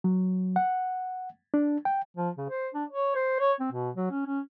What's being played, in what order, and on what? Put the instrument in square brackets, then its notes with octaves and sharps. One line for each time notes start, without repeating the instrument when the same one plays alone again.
[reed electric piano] F#3
F#5
D4
G5
[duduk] F3
C#3
C5
D4
C#5
C5
C#5
C4
B2
F#3
C#4
C#4